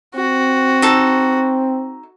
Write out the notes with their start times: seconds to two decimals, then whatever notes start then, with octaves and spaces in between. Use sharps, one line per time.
0.15 C4 F#4
0.82 D#4 A4